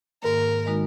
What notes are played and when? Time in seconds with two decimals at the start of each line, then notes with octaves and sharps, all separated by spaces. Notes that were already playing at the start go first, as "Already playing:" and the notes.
0.23 G#2 D#3 A#3 A#4
0.66 D#3 G#3 D#4 F#4